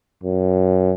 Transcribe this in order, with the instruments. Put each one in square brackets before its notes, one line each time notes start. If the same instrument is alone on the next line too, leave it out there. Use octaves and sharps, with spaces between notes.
[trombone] F#2